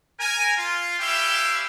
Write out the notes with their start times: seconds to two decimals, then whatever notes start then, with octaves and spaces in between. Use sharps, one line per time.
0.19 A#4 G#5
0.57 F4
0.99 C#4 E4 G4 E5 F5 G5